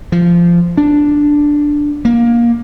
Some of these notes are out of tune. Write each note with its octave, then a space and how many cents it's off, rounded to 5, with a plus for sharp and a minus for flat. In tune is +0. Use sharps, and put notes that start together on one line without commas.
F3 -15
D4 +0
A#3 +15